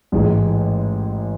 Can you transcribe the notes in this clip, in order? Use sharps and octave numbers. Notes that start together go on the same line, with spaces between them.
A1 G#2 G#3